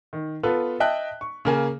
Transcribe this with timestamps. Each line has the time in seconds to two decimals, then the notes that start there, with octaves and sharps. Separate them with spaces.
0.13 D#3
0.43 B3 F4 A4 B4
0.80 D#5 E5 G5 A5 F#6
1.21 C#6
1.45 C#3 A#3 G#5